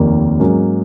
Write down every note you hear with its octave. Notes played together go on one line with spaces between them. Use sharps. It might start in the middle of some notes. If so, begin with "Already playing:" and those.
Already playing: F1 D#2 D#3 A#3
G#2 F#3 A#3 C#4